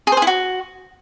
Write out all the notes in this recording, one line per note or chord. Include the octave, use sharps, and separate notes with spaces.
G#4
C5
G#4
E4
F#4